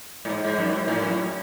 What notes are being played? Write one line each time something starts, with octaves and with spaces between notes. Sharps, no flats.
A2
G#2
G#2
F#2
G#2
A2
F#2